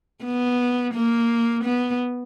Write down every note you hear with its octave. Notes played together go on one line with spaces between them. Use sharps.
B3
A#3
B3